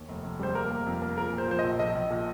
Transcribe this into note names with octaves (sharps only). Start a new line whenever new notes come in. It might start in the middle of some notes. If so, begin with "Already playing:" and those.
Already playing: D#2
F1
F1
G3 C5
A#3 A#4
A#3
F2
A#3
F3 A#4
A#2
C5
F3 C5
D#5
A#1
A#1 D#5
A#1
A#2